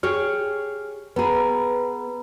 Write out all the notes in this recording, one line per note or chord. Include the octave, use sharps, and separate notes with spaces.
G4 G#4 C#5 F6
B3 G#4 B4 A#5 B5